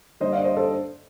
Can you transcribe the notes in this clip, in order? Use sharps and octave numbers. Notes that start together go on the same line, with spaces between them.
G2 D3 G3 A#3 C5 D#5
D5 F5
C5 D#5
A4 C5